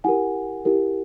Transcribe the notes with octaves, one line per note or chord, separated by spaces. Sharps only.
E4 G4 A#4 F#5 G#5
E4 G4 A#4